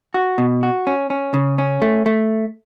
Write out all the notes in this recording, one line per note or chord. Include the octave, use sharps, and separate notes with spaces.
F#4
B2
F#4
C#4
C#4
C#3
C#4
A3
A3